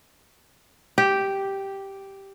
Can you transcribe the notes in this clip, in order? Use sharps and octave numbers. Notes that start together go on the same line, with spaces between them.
G4